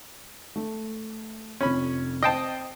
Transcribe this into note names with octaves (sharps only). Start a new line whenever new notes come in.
A3
F1 F2 C#4 B5
C4 D#5 G5 A5 C7